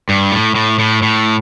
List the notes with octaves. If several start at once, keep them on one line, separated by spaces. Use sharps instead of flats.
G2
A2
A2
A2
A2